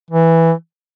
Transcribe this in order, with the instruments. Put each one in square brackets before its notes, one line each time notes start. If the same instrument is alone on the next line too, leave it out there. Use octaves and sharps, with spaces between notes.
[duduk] E3